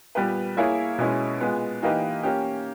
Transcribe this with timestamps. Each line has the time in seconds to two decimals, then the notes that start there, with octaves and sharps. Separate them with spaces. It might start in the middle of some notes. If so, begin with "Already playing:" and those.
0.15 A#2 G3 B3 G4 B4
0.57 A#3 E4 G#4 C#5
0.98 B2 G#3 C#4 E4
1.40 A#2 G#3 B3
1.82 E3 A#3 D#4 G4 B4
2.23 A#3 C#4 G4